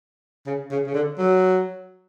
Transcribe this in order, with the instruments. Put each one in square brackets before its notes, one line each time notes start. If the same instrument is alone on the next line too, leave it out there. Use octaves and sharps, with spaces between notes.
[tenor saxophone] C#3
C#3
C#3
D3
F#3